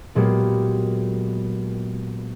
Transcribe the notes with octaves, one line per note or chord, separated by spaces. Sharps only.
A#2 F#3 G#3 A#3 B3 G4